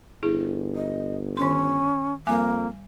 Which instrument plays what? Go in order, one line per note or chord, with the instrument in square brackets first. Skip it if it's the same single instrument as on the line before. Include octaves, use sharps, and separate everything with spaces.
[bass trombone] G1 [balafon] E4 G#4
[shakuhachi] D#5
[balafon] D#3 C6 [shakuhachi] C#4
[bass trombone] F2 [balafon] G3 G#5 D6 [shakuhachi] A#3